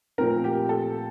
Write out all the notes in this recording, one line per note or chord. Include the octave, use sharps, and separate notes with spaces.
A#2 F3 A3 C4 A#4
G4
A4